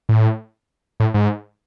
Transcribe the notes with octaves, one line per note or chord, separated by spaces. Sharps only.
A2
A2
G#2